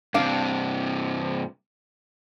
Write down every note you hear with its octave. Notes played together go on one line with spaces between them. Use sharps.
G2 C3 D4 F5